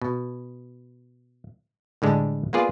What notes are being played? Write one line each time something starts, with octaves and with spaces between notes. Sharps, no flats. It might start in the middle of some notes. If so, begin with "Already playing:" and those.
B2
A2 D3 G#3 D4 G4
A#3 B3 F4 G#4 D5